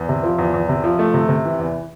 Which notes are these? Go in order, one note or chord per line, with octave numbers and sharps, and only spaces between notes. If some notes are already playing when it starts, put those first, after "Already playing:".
Already playing: E2
C3
F3
E2
E2
C3
F3
A3
C3
C3
E3
E2